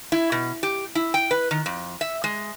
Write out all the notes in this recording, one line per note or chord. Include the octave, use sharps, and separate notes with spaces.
E4
B2
G4
E4
G5
B4
D#3
F2
E5
G#3